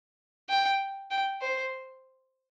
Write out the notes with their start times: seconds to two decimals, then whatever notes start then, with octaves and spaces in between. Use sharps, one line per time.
0.49 G5
1.11 G5
1.41 C5